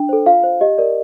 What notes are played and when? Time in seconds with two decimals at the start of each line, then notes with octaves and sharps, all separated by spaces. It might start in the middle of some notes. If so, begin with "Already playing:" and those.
Already playing: D4 G5
0.09 A4 C5
0.26 F4 F5
0.43 C5
0.61 G4 D#5
0.78 A#4 D5